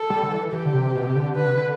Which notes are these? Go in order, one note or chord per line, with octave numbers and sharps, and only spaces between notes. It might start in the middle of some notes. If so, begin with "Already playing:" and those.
Already playing: A4
G3
D3
E3
E3 G4
D3
C3
B2
C3
D3
D3 B4
C3
D3